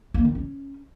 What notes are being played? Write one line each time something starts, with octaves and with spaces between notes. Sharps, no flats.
A#3
D#3
C#4